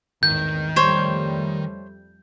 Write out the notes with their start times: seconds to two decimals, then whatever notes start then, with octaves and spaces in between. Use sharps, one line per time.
0.23 G#1 E2 A2 D#3 G6
0.76 F2 G3 A3 C5 C#5